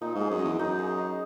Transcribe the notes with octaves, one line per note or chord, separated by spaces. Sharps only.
A#2 D#4
G#2
G#4
F#2
D#5
E2
F#2 D#4
G#4
D#4